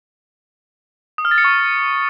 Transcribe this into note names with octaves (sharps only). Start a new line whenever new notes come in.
D#6
F6
A6
C#7
C#6